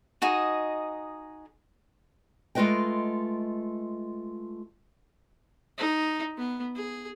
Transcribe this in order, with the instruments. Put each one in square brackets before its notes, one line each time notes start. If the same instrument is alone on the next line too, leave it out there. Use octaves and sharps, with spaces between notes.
[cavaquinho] D#4 F#4 G#4 D#5
[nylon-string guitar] G#3 A3 F4 B4 D#5 G5
[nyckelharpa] D#4
B3
G#4